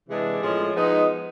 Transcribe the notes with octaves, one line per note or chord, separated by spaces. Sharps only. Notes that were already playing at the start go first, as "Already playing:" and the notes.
C3 E3 G#3 B3 D4
A2 F3 G#3 C#4 F4
F3 G#3 B3 D#4